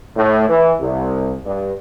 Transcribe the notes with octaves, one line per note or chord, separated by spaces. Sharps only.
A2
E3
C2
G2